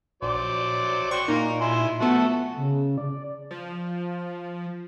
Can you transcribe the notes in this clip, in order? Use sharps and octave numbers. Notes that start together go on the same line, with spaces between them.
A#1 F#3 C5 D5
F#4 G5 C6 C#6
A#2 A#3 D#4 A#4
E4 G#5 C6
F3 A3 B3 F#4 A4 E5
C#3
D5
F3